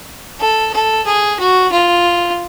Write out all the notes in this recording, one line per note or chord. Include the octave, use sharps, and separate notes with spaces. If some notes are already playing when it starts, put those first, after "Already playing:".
A4
A4
G#4
F#4
F4